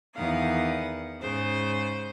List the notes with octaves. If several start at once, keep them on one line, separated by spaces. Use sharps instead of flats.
E2 D#3 F5 F#5
G#2 C#3 C5